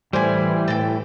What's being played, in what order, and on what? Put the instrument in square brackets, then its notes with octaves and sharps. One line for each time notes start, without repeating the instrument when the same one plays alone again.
[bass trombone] A2 [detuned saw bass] E3 [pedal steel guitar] G3 E4 [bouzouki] C5 D5 G#5
[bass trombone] A2 [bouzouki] A4 G5